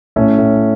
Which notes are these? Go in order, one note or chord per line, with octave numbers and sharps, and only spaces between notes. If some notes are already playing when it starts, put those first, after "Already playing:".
A2 A3 C#4
A2